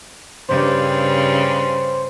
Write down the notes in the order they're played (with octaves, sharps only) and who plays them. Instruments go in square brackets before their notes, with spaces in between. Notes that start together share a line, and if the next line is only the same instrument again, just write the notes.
[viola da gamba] G2 C#3 [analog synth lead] C5